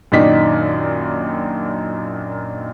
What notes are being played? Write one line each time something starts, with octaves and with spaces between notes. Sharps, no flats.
F#2 A#2 D#3 D4 D#4 B6